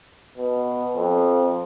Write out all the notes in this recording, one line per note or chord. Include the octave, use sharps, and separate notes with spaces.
B2
F2